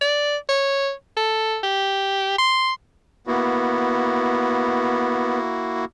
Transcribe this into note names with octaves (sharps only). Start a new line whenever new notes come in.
D5
C#5
A4
G4
C6
A#3 B3 E4 F#4